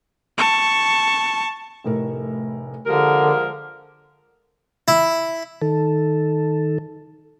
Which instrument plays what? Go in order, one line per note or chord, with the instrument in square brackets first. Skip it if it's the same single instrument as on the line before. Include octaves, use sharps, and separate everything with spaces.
[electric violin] A5 C#6
[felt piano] F1 A2 A#4
[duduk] D3 [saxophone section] F3 G#3 A#4 [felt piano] G4
[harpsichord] E4
[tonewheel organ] D#3 A4